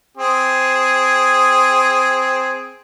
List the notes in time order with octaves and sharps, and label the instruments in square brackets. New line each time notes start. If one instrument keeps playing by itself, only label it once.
[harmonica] C4 G#4